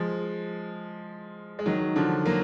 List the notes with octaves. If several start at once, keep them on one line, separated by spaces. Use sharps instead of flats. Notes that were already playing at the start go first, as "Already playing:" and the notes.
Already playing: F3 G#3
G#3
D#3 F#3
D3 F3
F#3 A#3